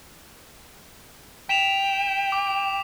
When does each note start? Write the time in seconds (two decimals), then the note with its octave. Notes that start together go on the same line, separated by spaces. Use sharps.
1.49 G5 B6 E7 F7
2.32 D6